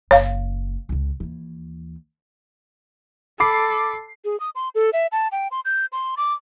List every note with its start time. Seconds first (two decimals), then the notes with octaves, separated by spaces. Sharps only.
0.11 F#1 C#5 F5
0.89 C#2 C#3
1.20 D#2 E3
3.40 A4 B5 D6 C7
4.25 G#4
4.40 D#6
4.55 C6
4.75 A4
4.93 E5
5.12 A5
5.32 G5
5.51 C6
5.65 G6
5.92 C6
6.17 D6